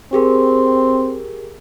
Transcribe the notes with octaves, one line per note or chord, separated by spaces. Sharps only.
C4 G4 G#4 A#4